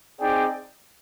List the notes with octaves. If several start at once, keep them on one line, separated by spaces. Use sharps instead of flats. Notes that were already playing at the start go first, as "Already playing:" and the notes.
C4 D#4 G#4 D5 G5